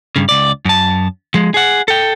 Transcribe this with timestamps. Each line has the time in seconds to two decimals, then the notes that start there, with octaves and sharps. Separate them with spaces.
0.16 G2 C#3
0.29 C#2 D5
0.65 F#2 A5
1.34 F3 G#3
1.54 G#4 F#5
1.88 A4 G5